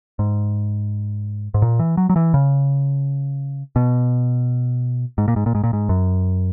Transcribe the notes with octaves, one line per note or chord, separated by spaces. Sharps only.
G#2
G#2
A#2
E3
F#3
F#3
E3
C#3
B2
G#2
A#2
G#2
A#2
G#2
A#2
G#2
F#2